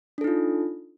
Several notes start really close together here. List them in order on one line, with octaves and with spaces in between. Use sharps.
D4 A4 D#4 F4